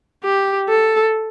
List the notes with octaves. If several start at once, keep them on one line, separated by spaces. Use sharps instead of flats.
G4
A4